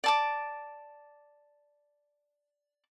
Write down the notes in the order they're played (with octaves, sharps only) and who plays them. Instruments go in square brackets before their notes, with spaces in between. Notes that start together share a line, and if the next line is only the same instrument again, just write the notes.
[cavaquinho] D5 A5 D6